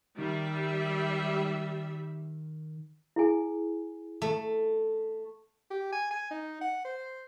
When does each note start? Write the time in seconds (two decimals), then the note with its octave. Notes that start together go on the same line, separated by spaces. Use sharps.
0.18 D#3 G3 E5
3.16 E4 G#4 G#5
4.22 A3
5.70 G4
5.92 G#5
6.11 G#5
6.31 D#4
6.61 F#5
6.85 C5